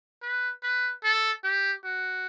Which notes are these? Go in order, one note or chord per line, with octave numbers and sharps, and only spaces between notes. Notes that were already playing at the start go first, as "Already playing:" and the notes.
B4
B4
A4
G4
F#4